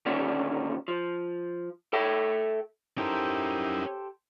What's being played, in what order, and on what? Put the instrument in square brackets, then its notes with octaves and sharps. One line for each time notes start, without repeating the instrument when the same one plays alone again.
[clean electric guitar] D#2 A#2 D3 C#4 D4
F3
A4 E5 G5
[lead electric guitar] C#4 A#4 [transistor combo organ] D#4 E4 [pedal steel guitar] G4 A4 C5